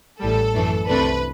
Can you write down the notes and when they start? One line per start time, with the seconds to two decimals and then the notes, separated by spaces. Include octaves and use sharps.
0.20 A1 A2 G3 A4
0.54 F#2 E3 A3 D4
0.88 C2 C3 E3 A3 D4 B4